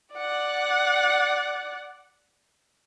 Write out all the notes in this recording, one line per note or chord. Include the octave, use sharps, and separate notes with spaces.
D5 F#5